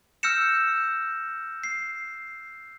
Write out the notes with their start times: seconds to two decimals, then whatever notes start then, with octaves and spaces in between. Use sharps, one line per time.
0.23 E6 F6 G6 A#6 C#7 E7
1.64 C7